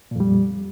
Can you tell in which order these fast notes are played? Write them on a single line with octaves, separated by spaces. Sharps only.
A#2 F2 G3